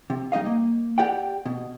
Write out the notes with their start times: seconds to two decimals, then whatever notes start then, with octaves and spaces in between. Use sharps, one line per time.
0.10 C3
0.32 G3 D#4 D#5 F5
0.46 A#3
0.98 G4 D5 F#5 G5
1.46 B2